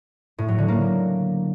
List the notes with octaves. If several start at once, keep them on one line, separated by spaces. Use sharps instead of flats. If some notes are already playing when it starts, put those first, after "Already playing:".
A2
F#3
D3
A#3